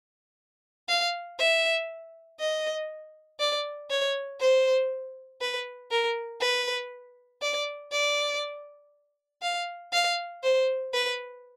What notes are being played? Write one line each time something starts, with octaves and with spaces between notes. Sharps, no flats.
F5
E5
D#5
D5
C#5
C5
B4
A#4
B4
D5
D5
F5
F5
C5
B4